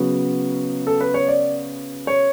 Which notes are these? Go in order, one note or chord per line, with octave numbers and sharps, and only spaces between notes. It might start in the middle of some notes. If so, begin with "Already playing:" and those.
Already playing: C#3 F#3 B3
A4
B4
C#5
D5
C#5